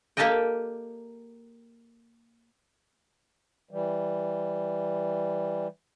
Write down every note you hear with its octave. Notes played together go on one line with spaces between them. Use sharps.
A#3 G4 A4 A#4 D#5 G5
E3 G3